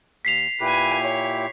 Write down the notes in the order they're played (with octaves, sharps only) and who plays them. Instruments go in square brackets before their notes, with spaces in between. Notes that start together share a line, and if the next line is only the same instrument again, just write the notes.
[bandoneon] D#2 [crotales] B6 C7 F7
[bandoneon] A#2 E4 G4 [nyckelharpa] B4 G#5
[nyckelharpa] C#5